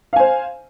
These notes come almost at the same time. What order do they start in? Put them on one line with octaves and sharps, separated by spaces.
F5 G#5 C5